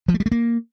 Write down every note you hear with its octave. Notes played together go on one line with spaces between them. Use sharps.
F3
A3
G3
A3
A#3